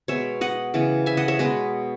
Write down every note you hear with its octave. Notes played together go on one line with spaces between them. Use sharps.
B2 G#3 B3 C#5 E5
D#5 F#5
C#3 E3 B3
E5 G#5
D#5 F#5
C#5 E5
B2 G#3 B3 B4 D#5